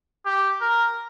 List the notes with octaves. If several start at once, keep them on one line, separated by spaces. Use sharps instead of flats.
G4
A#4